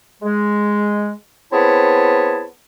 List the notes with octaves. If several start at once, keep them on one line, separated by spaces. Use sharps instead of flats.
G#3
B3 C4 E4 G#4 C#5 A5